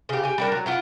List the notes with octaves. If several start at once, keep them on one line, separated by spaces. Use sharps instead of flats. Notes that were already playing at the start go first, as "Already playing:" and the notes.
C#3 G4
G4 G#5
G3 D4 A#4
F#3
E4 F4 F#5